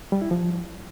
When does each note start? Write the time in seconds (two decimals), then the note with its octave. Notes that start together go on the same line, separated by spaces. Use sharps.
0.12 G3
0.22 E4
0.31 F3